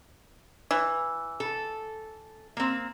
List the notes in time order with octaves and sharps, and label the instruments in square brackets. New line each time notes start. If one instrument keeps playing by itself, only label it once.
[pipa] E3
[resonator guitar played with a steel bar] A4
A#3 C4